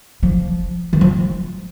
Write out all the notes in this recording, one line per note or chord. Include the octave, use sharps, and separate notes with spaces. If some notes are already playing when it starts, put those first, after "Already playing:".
F3
E3
F3